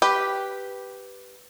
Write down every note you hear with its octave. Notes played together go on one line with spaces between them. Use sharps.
G4 B4